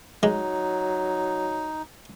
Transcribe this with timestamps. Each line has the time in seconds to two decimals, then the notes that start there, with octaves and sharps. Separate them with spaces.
0.23 F#3 G#3 D#4